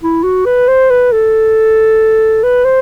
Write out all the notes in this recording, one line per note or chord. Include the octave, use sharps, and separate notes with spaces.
E4
F#4
B4
C5
B4
A4
B4
C5